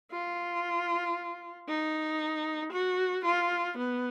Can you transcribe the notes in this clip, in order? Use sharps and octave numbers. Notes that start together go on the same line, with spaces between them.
F4
D#4
F#4
F4
B3